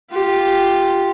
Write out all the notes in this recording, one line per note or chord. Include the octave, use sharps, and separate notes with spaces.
F4 G4